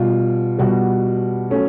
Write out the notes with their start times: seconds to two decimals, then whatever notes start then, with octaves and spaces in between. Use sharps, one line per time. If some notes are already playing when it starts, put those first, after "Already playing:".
Already playing: B2 G3 F4
0.59 B2 G3 F#4
1.50 F#3 A3 C#4